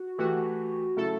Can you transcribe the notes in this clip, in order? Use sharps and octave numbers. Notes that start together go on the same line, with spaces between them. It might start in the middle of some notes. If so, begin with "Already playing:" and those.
Already playing: F#4
E3 A3 E4 F#4 G4
C#3 F#3 A3 E4 A4